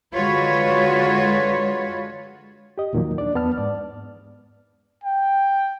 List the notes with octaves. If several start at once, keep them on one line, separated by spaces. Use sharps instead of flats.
D3 G#3 F4 F#4 B4 C#5
G4 D#5
D#2 A#2 D#3 F3 F#3 A#3
D4 D5
E2 B3 A5 F6
G#2 D5
G5